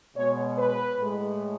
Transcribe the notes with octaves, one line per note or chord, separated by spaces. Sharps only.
B2 G#3 C#5
B4
A2 G#3